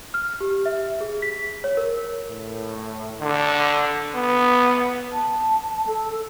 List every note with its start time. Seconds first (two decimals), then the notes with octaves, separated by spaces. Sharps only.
0.14 F6
0.41 G4
0.66 E5
1.01 G#4
1.22 B6
1.64 C#5
1.77 A#4
2.29 A2
3.20 D3
4.15 B3
5.12 A5
5.87 A4